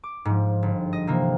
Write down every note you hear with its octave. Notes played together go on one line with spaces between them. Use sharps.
D6
G#2 F3
G1
D#5
C3 E3 A#3